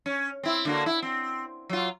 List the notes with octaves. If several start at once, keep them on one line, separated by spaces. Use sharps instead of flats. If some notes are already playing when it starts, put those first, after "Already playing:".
C#4
C4 E4
D3 A#3 F#4
E4
C4
F#3 F4